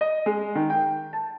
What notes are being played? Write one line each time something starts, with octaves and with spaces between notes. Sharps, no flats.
D#5
G#3
D#3
G5
A5